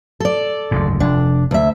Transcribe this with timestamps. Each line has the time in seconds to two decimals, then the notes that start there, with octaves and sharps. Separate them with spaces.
0.20 A4 D5
0.71 F#1 D2 G#2
1.00 F1 D4
1.51 D2 E5